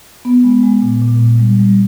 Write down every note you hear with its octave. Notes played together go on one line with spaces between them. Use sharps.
B3
G#3
G#3
A#2
A#2
A#2
G3
G3